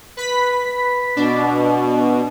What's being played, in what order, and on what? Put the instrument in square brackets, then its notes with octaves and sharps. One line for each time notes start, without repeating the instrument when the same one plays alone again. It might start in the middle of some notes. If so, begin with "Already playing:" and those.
[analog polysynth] B4 B5 B6
[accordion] B2 [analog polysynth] D4